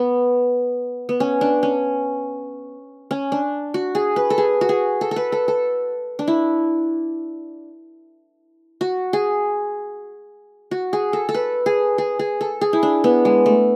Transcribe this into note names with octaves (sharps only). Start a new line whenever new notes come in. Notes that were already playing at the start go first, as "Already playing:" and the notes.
Already playing: B3
B3
C#4
D4
C#4
C#4
D4
F#4
G#4
B4
A4
G#4
F#4
G#4
A4
A4
B4
A4
A4
D4
E4
F#4
G#4
F#4
G#4
A4
A4
B4
G#4
G#4
G#4
A4
G#4
E4
D4
B3
G#3
A3